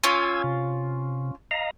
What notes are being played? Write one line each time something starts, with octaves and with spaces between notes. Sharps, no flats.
C#4 F4 G#5 E6 G#6
C3
D#5 F5 A#5